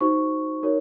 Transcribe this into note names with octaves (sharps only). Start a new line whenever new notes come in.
D#4 F#4 C5 C#6
D#4 F#4 A#4 C#5